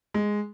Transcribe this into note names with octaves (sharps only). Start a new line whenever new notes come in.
G#3